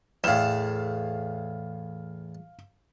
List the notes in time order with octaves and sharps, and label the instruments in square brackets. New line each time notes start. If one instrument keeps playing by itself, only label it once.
[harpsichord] E2 A2 [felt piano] F5 E7